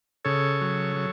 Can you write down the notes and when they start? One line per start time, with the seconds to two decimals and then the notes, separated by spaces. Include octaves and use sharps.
0.25 C#3 A4 C#5
0.61 F#3
0.96 F#3